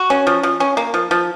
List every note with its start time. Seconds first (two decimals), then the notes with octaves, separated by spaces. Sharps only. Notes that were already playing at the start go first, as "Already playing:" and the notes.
Already playing: F#4
0.10 C#4
0.27 F3
0.43 F3
0.60 C#4
0.77 A#3
0.94 F3
1.11 F3